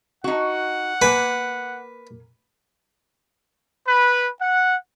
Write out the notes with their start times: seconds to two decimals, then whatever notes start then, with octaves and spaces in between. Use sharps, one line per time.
0.24 D#4 F#4 F#5
1.02 A#3 B4 G#5
3.88 B4
4.39 F#5